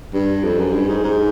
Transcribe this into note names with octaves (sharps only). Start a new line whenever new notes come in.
G2
F2
F#2
G2
G#2
G#2